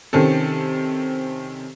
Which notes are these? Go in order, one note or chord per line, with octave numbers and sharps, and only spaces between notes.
C3 D#3 C4 C#4 A4